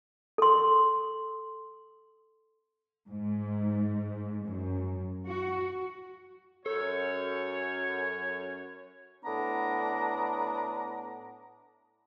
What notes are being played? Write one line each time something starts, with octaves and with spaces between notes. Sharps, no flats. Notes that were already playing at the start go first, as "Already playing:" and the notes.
A4 C6
G#2
F#2
F#4
F#2 A4 C#5
A2 B3 D4 A#5